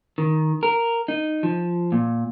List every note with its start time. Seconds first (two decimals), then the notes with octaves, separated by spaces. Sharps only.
0.18 D#3
0.63 A#4
1.08 D#4
1.43 F3
1.92 A#2